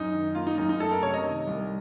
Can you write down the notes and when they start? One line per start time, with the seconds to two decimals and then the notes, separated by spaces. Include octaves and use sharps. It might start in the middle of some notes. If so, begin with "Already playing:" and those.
Already playing: F#2 D#4
0.13 D#3
0.35 A#3 F4
0.47 D#4
0.58 F#2 D#4
0.69 D#4
0.80 A3 A4
0.91 A#4
1.02 C3 C#5
1.14 D#5
1.25 D#3
1.47 C2